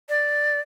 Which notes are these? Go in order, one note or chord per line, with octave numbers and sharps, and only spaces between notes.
D5